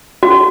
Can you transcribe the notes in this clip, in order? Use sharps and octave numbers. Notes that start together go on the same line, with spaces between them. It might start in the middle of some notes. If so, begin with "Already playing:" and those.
F#4